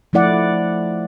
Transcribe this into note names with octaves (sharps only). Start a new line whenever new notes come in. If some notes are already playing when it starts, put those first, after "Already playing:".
F3 A3 E4 D5 F#5